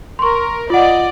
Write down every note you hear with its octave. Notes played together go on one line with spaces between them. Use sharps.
A#4 C6 C#6
F4 D5 D#5 F#5